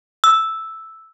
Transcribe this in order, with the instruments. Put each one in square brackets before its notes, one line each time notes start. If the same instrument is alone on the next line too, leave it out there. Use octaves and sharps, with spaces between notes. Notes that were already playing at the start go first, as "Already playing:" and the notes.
[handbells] E6